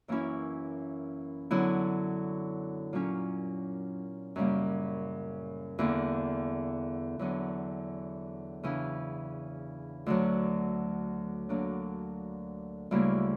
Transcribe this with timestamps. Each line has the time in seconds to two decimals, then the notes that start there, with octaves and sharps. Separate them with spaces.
0.08 F#2 E3 A#3 C#4 E4
1.51 D3 F#3 B3 E4
2.93 A#2 F#3 C#4
4.36 F#2 C#3 G3 A#3
5.79 E2 D3 A#3
7.19 E2 D3 F#3 B3
8.63 C#3 E3 B3 D4
10.06 D2 D3 F#3
11.49 D3 F#3 A#3 D4
12.91 D2 C#3 G3 A#3 E4